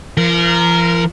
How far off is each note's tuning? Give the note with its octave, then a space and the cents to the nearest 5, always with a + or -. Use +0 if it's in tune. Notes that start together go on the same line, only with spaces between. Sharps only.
F3 -40 A#4 -5